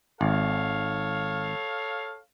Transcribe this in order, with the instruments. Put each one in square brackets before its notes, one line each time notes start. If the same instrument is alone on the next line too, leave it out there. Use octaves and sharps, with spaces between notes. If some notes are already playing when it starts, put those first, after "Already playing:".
[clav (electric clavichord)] G#1 [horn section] A4 C#5 F5